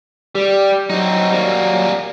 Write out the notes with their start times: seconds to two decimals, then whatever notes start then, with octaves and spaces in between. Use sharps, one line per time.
0.35 G3 G4
0.90 F#3 C4 D#4
1.31 G3 A#3